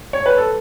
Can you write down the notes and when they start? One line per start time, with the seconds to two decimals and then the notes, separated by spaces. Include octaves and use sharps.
0.13 C#5
0.26 B4
0.37 A4